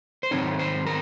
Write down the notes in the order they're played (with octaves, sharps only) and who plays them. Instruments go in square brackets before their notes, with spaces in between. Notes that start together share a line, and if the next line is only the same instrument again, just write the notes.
[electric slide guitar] C5
G#2 D#3 F#3 C4 D#4 C#5
C5
A#4